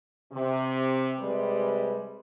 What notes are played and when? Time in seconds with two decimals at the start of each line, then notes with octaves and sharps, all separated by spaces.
0.32 C3
1.19 C3 G3 G#3 B4